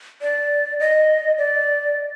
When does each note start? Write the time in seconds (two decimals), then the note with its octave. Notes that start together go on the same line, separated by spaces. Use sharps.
0.22 D5
0.80 D#5
1.38 D5